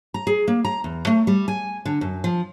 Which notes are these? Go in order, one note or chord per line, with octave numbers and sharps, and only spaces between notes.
A#5
G#4
A#3
A#5
E2
A3
G3
G#5
D3
F#2
F3